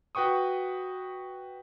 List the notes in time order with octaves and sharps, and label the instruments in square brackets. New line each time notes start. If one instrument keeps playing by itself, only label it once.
[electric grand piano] F#4 B4 G5 C#6 D#6